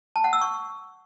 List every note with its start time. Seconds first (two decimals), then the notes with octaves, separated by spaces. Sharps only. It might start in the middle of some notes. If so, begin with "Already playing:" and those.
0.16 A5
0.24 F#5
0.33 E6
0.41 C#6